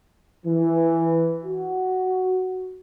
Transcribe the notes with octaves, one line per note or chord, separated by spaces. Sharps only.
E3
F#4